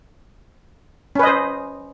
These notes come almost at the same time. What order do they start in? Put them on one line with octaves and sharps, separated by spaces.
C#4 B4 D#5 C5